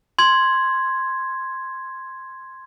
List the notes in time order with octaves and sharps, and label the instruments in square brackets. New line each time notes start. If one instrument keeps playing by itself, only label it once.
[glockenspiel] C6 G#6